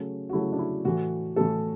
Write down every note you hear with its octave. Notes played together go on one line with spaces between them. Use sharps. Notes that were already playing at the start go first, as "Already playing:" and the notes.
Already playing: C#3 F#3 A3 C#4
F#4
C#3 F#3 A3 E4
D4
E4
A2 E3 A3 F#4
A2 E3 A3 A4